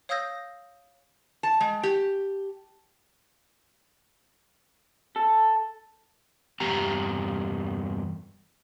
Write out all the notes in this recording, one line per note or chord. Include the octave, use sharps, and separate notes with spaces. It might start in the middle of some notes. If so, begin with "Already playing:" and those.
C#5 F5 D#6 E6 G6 A#6
A5
G#3
G4
A4
E2 G2 G4 A#5